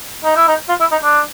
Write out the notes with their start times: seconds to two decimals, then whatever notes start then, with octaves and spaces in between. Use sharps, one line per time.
0.24 D#4
0.36 E4
0.48 D#4
0.69 F4
0.80 E4
0.92 D#4
1.03 D4